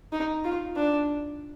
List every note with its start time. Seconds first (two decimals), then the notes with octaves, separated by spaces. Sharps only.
0.12 D#4
0.44 F4
0.76 D4